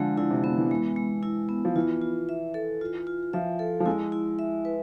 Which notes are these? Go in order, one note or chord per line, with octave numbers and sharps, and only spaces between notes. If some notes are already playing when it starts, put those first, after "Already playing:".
Already playing: D3 F3 G#3
D3 E4
C3
C3 B3
E3
G#3
G#3
E4
B3
F3
E3 F4
F4
E5
A4
F4
F4
F3 E5
A4
F3
G#3 E4
E4
E5
B4